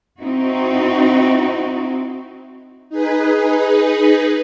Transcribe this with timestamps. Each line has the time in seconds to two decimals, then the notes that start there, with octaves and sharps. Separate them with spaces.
0.21 C4 D#4 E4 F#4
2.90 D#4 G#4 B4